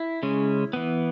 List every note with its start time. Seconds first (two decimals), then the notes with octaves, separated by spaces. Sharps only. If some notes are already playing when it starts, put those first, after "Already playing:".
Already playing: E4
0.23 C#3 G#3 C#4
0.73 E3 B3